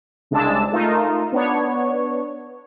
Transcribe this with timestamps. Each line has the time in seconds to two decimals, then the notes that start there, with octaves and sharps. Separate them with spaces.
0.31 C2 C#3 G#3 D4 A5 E6
0.72 A3 D#4 F4 A#4
1.32 B3 D4 C#5